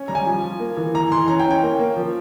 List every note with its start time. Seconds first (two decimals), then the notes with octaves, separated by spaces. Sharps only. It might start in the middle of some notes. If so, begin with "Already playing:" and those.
Already playing: C#4
0.08 G3 A#5
0.15 G#5
0.26 F3
0.43 F3
0.60 A#3
0.77 E3
0.94 E3 A#5
1.12 E3 C6
1.28 C#4 A#5
1.40 G5
1.45 C#4
1.51 G5
1.63 A#3
1.79 A#3
1.97 F3